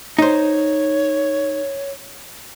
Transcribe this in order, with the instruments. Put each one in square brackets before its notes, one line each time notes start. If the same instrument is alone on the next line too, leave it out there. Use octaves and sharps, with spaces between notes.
[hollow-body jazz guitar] D#4 C5 [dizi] C#5